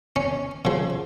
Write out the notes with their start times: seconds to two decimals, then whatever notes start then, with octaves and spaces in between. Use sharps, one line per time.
0.16 C#4
0.65 C#3 F3